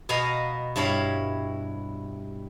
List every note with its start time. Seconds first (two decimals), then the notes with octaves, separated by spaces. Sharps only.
0.09 B2 B3 D#5 F5 A#5
0.76 G2 E4 C#5 F5 B5